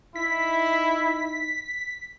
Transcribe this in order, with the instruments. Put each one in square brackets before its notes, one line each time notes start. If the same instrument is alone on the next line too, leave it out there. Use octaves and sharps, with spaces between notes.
[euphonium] D#4 [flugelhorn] E4 [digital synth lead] B6